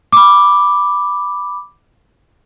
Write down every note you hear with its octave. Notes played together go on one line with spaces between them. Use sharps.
B5 D6